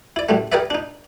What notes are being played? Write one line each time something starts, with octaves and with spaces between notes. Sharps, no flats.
E4 D5
F#2 A2 G3 A3
G4 G#4 A#4 B4 D5 E5
D4 D#4